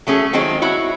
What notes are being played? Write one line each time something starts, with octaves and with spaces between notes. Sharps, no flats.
F#3 A3 C#4 G#4
D#3 F#3 G#3 C4 F4
E4 F#4 C#5